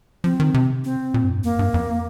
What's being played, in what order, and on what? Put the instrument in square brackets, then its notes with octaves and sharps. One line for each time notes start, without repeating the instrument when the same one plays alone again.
[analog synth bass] F3 [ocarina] C4
[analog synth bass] D#3
C3
[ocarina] C4
[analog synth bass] A#2
G2
F2
G2
[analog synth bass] F2 [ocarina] A#3
[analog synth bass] G2
F2